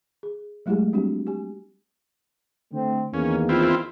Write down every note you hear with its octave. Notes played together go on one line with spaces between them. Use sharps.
G#4
F#3 G#3 A3 E4 G4 G#4
G3 C4 D4 F#4 G4
G4 G#5
D3 A3 C4
E2 D#3 A#3 C#4
C4 E4 F4